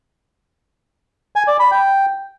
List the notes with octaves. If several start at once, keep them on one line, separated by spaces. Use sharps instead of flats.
G#5
D5
B5
G5